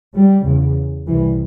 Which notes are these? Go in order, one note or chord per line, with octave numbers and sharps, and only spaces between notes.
G3
E2 C#3
C2 C3 E3